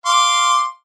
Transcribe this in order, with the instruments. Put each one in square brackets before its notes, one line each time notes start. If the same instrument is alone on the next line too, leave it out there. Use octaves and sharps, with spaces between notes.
[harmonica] F5 C6 D6